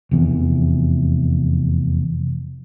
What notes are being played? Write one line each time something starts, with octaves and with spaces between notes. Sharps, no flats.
F1 E2